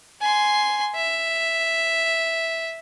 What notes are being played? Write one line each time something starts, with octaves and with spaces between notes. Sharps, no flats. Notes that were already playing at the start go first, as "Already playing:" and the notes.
G#5 C6
E5